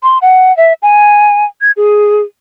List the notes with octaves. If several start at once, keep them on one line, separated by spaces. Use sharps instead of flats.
C6
F#5
E5
G#5
G#6
G#4